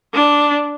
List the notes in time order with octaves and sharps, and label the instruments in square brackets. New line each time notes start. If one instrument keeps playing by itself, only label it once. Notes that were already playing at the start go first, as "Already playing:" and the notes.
[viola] D4